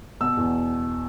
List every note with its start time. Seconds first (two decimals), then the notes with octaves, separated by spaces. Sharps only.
0.21 B2 E6
0.37 E2